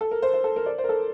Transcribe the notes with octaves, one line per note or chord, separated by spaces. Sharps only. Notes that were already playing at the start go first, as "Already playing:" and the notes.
A4
A#4
C5
C5
A4
A#4
D5
C5
A#4
A4